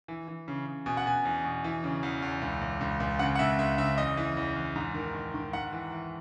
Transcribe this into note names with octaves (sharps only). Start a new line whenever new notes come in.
E3
E3
C#3
C#3
B2 G#5
F#5
B2 G#5
E2
B2
E3
C#3
E2
E2
C#2
C#2
C#2
C#2
C#3 F#5
F#5
C#2 E5
C#2 E5
C#3 E5
E2 D#5
E3
E2
E2
G#2
D#3
D#3
D#3
G#2 F#5
E3
E3